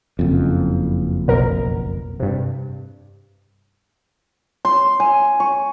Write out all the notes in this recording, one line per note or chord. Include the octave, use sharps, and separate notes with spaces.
F#1 F2
B1 B2 A#4
G2 C3
C6
G#5
C#6